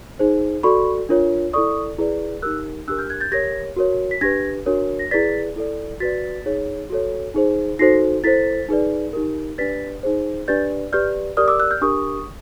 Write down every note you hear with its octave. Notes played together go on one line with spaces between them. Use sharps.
D#4 G#4 C5
F#4 A4 D5 B5 C#6
D4 F4 A#4 C#5
E4 A4 D5 C#6 D#6
E4 G#4 B4 D5
D#4 G4 A#4 E6 F#6
D4 G4 A#4 E6 F#6
F6 G6
F#6 G#6
G6 A6
G4 A#4 C#5 G#6 A#6
F#4 A#4 C#5
B6
D4 G4 B4 G#6 A#6
D4 F#4 A#4 C#5
A#6
E4 G#4 B4 D5 A6 B6
E4 A4 D5
F#4 B4 D5 A6 B6
D#4 G#4 C#5
F#4 A4 C#5
D#4 G#4 C5
D#4 F#4 A4 C5 A#6 C7
E4 A4 C5 A6 B6
D#4 G#4 B4 D5
D#4 G4 A#4
D4 G4 B4 D5 A6 B6
D#4 G#4 C5
D4 G4 B4 D5 G6 A6
G4 B4 D5 F6 G6
G4 A#4 D5 D#6 F6
D6 E6
E6 F#6
F6 G6
D4 G4 A#4 C#6 D#6